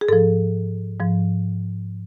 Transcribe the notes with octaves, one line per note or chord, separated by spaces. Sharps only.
G#4
G#2 F3 A4
G#2 F3